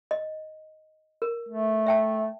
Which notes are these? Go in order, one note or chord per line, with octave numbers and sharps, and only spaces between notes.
D#5
A#4
A3
E5 G5 A5